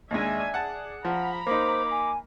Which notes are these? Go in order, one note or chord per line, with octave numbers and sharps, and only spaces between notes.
D#2 G#3 D4 E5 G#5
G#4 D5 F#5 A5
F3 F#5 A#5 B5
A#3 D#4 C5 D6
G#5